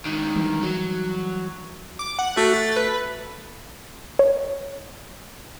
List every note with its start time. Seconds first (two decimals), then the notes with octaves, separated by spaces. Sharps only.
0.05 C#2 D#3
0.36 E3 G3
0.62 F#3
1.99 D6
2.19 F#5
2.37 A3 F#4
2.54 A6
2.76 B4
4.19 C#5